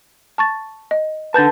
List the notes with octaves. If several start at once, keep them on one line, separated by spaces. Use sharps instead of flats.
A5 C#6 A6
D#5
D3 B4 A5 G6 A6